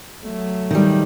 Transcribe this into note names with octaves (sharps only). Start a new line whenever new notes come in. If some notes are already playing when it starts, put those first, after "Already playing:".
F#3 A3
D#3 G3